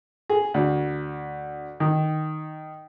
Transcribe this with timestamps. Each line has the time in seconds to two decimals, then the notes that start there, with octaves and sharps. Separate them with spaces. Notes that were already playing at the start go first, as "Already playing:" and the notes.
0.30 G#4
0.54 D2
1.80 D#3